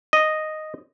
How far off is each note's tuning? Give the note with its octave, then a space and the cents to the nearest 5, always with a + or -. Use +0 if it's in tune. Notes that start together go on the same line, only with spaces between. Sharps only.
D#5 -5